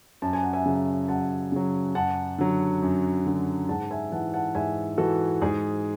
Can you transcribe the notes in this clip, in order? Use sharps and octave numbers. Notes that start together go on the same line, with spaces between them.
F#2 A5
G#5
F#5
E5 G#5
C#3 F#3
F#2 F#5 A5
C#3 F#3
F#2 F#5 A5
D3 F#3
F#2
D3 F#3
G#2 F#5 A5
E5 G#5
E3 F#5 A5
F#5 A5
G#2 E5 G#5
E3 F#4 A4
G#2 G#4